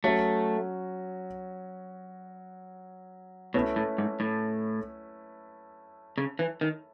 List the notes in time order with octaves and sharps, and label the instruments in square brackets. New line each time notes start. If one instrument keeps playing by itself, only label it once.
[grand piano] F#3 C#4 F#4 [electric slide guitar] A3
[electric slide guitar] B2 [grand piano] A3 C#4 E4 B4
[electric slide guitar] A2
G#2
A2
C#3
E3
D#3